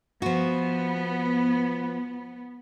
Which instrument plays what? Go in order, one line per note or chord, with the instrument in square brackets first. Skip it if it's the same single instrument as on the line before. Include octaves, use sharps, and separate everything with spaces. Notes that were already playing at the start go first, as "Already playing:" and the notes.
[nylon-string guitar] F3 F#4 [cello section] B3